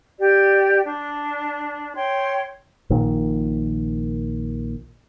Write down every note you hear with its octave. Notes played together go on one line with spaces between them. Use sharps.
G4 D5
D4
C#5 G5 C6
A#1 A#2 D#3